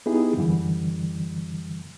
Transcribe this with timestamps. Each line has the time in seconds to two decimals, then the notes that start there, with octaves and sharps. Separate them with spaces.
0.06 B3 D#4 E4 G4 G#4
0.37 F#2 D3 E3 G3